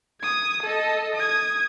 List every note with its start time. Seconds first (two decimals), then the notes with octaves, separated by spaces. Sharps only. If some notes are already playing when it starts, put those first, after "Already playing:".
0.21 D#6 G#6
0.62 A4 D#5
1.15 D#6 G#6